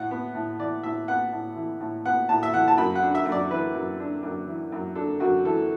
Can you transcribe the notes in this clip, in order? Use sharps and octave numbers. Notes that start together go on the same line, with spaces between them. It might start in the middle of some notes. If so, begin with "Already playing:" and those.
Already playing: A2 F#5
B3
A2
E3 D5
A2 E5
B3 F#5
A2
E3
A2
B3 F#5
A2 A5
E5
E3 F#5
A5
F#2 B5
F#5
D4
E5
F#2
D5
E3 B4
F#2
D4
F#2
E3
F#2
D4 A4
F#2 F#4
E3 A4